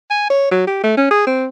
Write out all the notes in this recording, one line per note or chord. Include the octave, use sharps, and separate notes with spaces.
G#5
C#5
F#3
G4
A3
C#4
G#4
C4